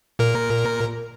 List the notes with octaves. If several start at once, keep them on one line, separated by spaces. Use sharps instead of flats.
A#2 A#4